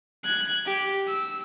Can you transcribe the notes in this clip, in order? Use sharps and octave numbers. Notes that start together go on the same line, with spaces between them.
F#6 G#6
G4
E6